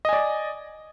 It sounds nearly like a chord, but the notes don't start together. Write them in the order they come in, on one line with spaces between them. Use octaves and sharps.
D#5 G#5 D5